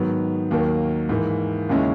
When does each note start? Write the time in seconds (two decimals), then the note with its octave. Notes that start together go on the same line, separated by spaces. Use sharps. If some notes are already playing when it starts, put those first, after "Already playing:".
Already playing: G#2 D#3 F#3 B3
0.51 D#2 D#3 F#3 A#3
1.09 G#2 E3 A#3
1.69 D#2 C#3 G#3 C#4 E4